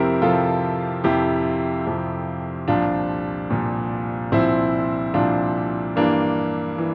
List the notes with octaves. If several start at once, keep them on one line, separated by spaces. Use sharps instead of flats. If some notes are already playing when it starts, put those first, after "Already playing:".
Already playing: F2 C3 F3 C4 E4 G4 A#4
F2 C3 F3 F4 A4
F2 C3 F3 E4 G4
F2 C3 F3
C2 A#2 F3 D4 F4
C2 A#2 F3
C2 A#2 F3 C4 E4
C2 A#2 F3 D4 F4
G2 E3 A#3 D4
E3